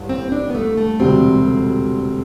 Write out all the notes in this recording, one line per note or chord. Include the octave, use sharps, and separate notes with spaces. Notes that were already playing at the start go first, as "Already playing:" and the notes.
Already playing: A1 G2
C4
D4
B3
A3
A3
E1 D2 C3 G3 C4